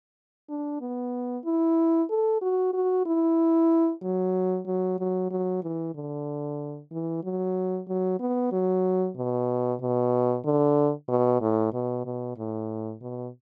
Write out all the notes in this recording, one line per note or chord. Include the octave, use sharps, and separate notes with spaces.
D4
B3
E4
A4
F#4
F#4
E4
F#3
F#3
F#3
F#3
E3
D3
E3
F#3
F#3
B3
F#3
B2
B2
D3
B2
A2
B2
B2
A2
B2